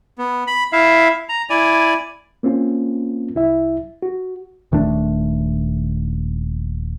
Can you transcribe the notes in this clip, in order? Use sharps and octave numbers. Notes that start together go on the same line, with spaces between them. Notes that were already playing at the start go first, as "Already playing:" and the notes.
B3
B5
E4 E5 F5
A#5
E4 D5 G#5
A#3 C4 C#4 F4
C2 E4 E5
F#4
D#1 D#3 A3 D4